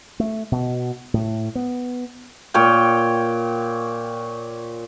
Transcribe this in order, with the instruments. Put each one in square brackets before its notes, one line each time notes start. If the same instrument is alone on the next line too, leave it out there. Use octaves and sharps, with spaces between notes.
[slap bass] A3
B2
A2
B3
[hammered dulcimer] A#2 C#5 G5